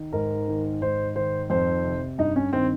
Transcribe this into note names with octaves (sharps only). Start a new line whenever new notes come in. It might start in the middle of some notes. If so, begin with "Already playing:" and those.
Already playing: D#3
G#2 A#4
D#3
G#2 C5
D#3 C5
F2 C5
C3
G2 D#4
C#4
D#3 C4